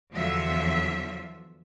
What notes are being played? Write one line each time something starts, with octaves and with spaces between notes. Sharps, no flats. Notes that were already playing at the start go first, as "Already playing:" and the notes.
E2 D3 F3 F#3 F4 E5